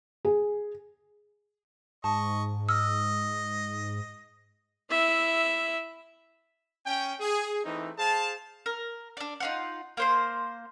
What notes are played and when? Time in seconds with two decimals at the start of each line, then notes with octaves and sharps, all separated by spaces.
0.25 G#4
2.04 G#2 D#5 A5 C#6
2.69 D#5 E6 F6
4.90 E4 E5
6.86 C#4 G5
7.20 G#4
7.65 E3 A3 C4 D#4
7.98 G#4 C5 F5 A5
8.66 A#4
9.17 D4 D5
9.40 D#4 F4 F#5
9.97 A#3 C5 C6